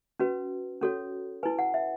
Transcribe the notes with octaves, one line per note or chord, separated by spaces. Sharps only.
C#4 F#4 B4
C#4 F#4 A4 C#5
E4 B4 G#5
F#5
E5